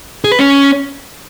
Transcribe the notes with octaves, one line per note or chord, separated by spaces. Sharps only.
G#4
B4
C#4